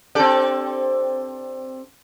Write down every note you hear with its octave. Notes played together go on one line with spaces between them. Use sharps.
C4 D4 G4 A4 D5